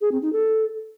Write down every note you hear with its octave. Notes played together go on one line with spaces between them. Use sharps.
G#4
C4
D#4
A4